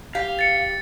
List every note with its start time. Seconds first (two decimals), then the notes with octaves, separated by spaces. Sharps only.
0.15 G4 F5
0.39 A6 C#7